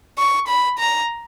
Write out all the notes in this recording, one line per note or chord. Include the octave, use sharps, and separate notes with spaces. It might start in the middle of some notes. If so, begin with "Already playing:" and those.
C#6
B5
A#5